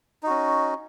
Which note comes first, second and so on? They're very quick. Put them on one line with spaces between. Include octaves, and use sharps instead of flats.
D#4 F#4 C#4